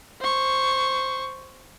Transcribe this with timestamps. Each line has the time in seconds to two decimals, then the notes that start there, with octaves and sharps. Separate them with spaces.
0.20 C5 C#6